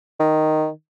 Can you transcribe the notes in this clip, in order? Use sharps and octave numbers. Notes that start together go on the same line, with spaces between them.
D#3